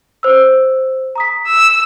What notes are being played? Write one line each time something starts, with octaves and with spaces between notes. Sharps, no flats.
C5 E6
A#5 D#6 B6
E6